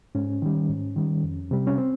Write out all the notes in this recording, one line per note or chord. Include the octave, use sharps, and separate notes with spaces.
G#2 C#4
D#3 G3
G#2
D#3 G3
F2
C3 G3
C#4
C4